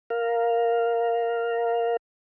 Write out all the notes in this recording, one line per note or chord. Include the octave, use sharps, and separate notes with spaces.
A#4 F5